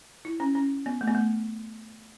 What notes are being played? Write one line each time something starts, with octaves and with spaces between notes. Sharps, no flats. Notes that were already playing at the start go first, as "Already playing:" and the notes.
E4
C#4
C#4
B3
A3
B3
A3